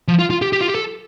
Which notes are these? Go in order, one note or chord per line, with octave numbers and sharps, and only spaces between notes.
F3
F4
F4
G4
G4
F4
G4
A4